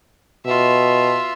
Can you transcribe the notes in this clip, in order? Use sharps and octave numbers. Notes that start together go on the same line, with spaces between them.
B2 F4 E5